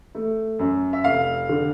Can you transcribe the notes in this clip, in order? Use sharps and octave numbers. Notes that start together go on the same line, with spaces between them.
A3
F#2
E5
F1 F5
D3